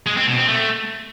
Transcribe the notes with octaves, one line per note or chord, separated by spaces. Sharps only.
G#3
C4
B2
C4
A3